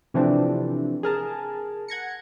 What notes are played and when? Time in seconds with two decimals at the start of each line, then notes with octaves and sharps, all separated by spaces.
0.14 C3 E3 F3 A3 C4 D4
1.03 G#4 A#4 A5
1.88 F#5 G#6 A#6 C#7